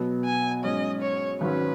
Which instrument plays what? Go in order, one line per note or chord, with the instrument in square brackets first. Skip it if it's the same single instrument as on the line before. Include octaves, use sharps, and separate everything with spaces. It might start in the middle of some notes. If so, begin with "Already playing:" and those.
Already playing: [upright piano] B2 F#3 B3
[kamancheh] G#5
[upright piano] G#2 F#3 C#4 [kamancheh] D#5
[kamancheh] C#5
[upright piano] G#1 G#2 F#3 C#4 [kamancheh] B4